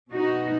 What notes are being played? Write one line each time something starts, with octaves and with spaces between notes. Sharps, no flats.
B2 D#4 F#4